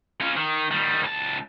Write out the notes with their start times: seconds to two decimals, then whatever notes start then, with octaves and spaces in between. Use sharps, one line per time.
0.21 C#4 F4
0.36 D#3
0.71 D#3 G3
1.02 C#2 A5